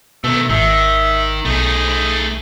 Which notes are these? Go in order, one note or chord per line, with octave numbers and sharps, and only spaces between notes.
B2 D#3 A3 E6
G#1 D#3 E5
B1 A3 D#4 G#4